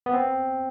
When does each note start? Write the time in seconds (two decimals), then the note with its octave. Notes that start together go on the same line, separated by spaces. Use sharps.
0.06 B3
0.13 C4